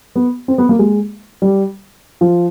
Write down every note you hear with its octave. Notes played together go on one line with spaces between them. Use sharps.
B3
C4
B3
A#3
G#3
G3
F3